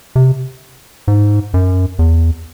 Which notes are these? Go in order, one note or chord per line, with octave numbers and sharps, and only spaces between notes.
C3
G#2
F#2
E2